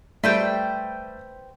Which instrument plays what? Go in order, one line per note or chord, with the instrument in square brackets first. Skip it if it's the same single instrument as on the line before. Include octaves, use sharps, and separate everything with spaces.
[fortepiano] G3 A3 [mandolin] B4 C5 G5